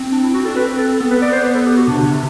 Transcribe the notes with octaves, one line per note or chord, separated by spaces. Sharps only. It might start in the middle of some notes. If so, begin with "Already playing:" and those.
Already playing: C4
D4
E4
F#4
A4
D4
C4 B4
A4
B3 A4
B4
D5
C5
B4
A4
G4
F#4
C3 D4
D3
C3